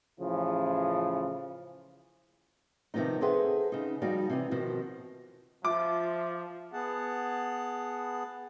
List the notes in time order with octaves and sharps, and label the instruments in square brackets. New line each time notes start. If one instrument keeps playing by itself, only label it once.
[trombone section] A1 C#3 F3 E4
[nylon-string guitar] C3 D#3 F3 B3 D#4
G#4 A4 B4 C5 E5 F#5
C#3 D#4
F3 G3 D#4 F#4 D5 F5
C3 E3 C4
B2 D#3 F3
[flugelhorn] F3 [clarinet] F4 [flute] E5 [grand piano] D6
[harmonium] B3 G#4 F#5 A5